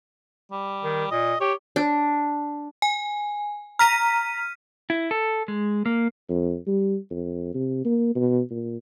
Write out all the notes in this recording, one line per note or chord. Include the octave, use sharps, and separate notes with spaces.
G3
D#3
A#2 D#5
G4 C#5
D4
G#5
A#5 F6 B6 D#7
E4
A4
G#3
A#3
F2
G3
F2
C3
A#3
B2
A#2